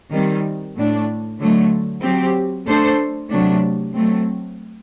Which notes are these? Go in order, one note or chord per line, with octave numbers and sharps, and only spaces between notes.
D#3 G3 C4
A2 A3 D4
D3 F#3 A3
F#3 C4 G4
A3 D4 A4 C5
C3 F#3 A3 D4
F#3 A3 C4